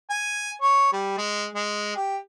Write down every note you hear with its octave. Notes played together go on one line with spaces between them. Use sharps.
G#5
C#5
G3
G#3
G#3
G4